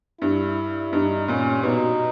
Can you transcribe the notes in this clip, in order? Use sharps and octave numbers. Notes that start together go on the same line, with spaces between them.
G2 E4
G2 D#4
A#2 C#4
B2 D#4